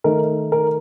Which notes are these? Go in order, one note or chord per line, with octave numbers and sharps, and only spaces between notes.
D#3 A3 D#4 A#4
A#4